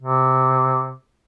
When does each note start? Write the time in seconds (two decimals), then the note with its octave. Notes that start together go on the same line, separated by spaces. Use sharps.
0.02 C3